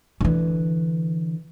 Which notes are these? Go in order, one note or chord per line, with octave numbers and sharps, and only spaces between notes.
D3 E3